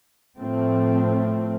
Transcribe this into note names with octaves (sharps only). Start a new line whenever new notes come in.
A2 F3 A3 C4